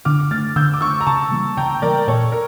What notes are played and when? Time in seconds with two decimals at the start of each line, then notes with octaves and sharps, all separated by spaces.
0.05 D3 D6 F6
0.31 A3 D4 F6 A6
0.56 D3 E6 G6
0.74 D6
0.81 A3 D4 C#6 E6
1.01 A#5
1.07 C#3 A5 C#6
1.31 E3 G3 A#3
1.57 C#3 G5 A#5
1.82 E3 G3 A#3 A#4 D5
2.07 A#2 A4 C#5
2.32 A#4